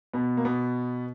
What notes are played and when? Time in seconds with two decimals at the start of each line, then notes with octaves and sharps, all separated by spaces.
0.13 B2 B3
0.37 A#3
0.45 B2 B3